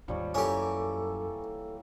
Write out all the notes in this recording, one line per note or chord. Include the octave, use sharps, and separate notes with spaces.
G#1 D#2 F3 G3 C#5
F#2 E3 A#3 C#4 G4 A4